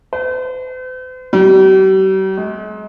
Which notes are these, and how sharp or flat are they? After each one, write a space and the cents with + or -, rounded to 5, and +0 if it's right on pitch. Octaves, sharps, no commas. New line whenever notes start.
C5 -45
G3 -45
G#3 +35